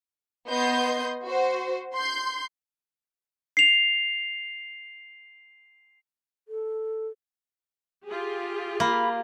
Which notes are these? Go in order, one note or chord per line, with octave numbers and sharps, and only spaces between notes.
B3 D#5 C6 G6
F#4 C5
C6 G6
C7 F7
A4
F4 G4 G#4
A#3 B5